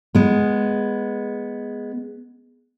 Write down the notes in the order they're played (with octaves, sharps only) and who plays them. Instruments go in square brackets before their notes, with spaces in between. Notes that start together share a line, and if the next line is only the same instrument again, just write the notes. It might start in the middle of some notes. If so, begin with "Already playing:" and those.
[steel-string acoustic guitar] G#3 B3